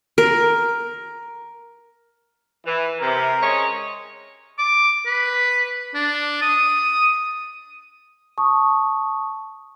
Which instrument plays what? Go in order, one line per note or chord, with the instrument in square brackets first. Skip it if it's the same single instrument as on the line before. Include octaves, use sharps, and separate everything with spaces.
[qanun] A#4
[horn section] E3
[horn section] C3 [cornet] A#4
[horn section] G#3 C#4 C#5
[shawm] D6
B4
D4
D#6
[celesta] A5 C#6 D#6